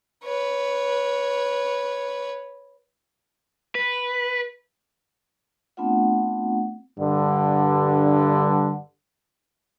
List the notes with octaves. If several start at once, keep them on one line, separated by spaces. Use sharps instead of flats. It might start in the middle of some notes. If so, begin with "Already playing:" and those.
B4 C#5
B4
A3 B3 C4 D4 F4 F#5
G2 D3